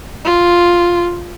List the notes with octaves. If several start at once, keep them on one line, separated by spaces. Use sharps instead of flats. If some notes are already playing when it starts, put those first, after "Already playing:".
F4